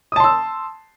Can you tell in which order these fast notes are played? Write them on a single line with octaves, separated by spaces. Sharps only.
D#6 A5 C6 E6